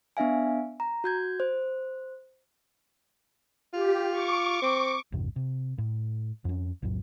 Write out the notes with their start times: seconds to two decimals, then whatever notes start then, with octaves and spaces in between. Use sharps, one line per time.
0.17 B3 D4 E5 F5 G#5
0.80 A#5
1.04 F#4 G6 G#6
1.40 C5
3.73 F4 G4
4.11 C#6 D6
4.62 C4
5.12 A1 E2 G2 C3
5.36 C3
5.78 A2
6.45 F2 C#4
6.82 B1 F2 A2 F#3